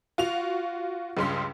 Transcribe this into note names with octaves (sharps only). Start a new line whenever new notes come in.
F4 F#4 F7
C#2 G2 C#3 G#3 C6 B6